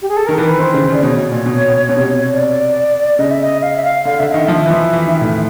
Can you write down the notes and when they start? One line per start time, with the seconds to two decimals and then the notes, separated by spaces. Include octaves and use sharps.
0.02 G4
0.09 G#4
0.17 A4
0.27 D#3 A#4
0.38 E3 A#4
0.49 B4
0.59 D#3 C5
0.74 C#3
0.88 C#3
0.94 D5
1.03 B2 C#5
1.17 B2
1.31 A#2
1.46 B2
1.68 B2
1.89 B2
1.96 C3
2.04 B2
2.33 D5
3.19 C#3 D#5
3.31 E5
3.43 D#5
3.62 F5
3.76 E5
3.84 F5
4.05 D3 F5
4.19 D3 E5
4.33 D#3 D#5
4.47 F3 E5
4.66 E3
4.70 F3
4.93 E3
5.07 D#3
5.21 A2